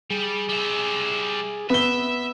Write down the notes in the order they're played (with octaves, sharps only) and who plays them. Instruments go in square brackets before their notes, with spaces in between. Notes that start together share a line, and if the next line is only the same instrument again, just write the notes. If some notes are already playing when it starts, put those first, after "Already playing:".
[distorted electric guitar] G3 [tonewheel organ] G#4
[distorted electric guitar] G3 E5
[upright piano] B3 G7 [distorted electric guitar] E5 [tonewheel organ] E6